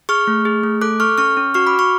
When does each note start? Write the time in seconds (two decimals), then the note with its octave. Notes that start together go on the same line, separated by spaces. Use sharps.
0.09 G#4 C#6 F6
0.27 A3
0.45 G#4
0.64 A3
0.81 A4 D6 F#6
1.00 A4 C#6 F6
1.18 C#4 C#6 F6
1.37 C#4
1.54 F#4 C#6 F6
1.67 B5 D6
1.73 F#4
1.79 C#6 F6